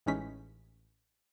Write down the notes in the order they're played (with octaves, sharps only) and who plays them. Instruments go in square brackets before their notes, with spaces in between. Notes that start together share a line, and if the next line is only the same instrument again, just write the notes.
[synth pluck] A1 E3 G#3 C#4 D#4 B6